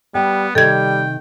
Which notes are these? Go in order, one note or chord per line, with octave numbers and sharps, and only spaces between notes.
G3 B3 G5
C3 D#3 G3 A4 G5 G#6